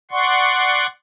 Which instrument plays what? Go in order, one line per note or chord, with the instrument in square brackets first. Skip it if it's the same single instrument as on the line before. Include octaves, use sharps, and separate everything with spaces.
[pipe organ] D5 F#5 C6 C#6